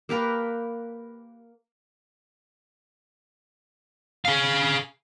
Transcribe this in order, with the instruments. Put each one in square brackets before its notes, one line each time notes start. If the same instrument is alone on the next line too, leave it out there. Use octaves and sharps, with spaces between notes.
[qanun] A#3 G4 A#4 B4
[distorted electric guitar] G#4 F5